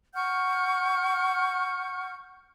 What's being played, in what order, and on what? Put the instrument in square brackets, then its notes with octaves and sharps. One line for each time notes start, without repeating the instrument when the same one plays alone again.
[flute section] F#5 C#6 F6 G6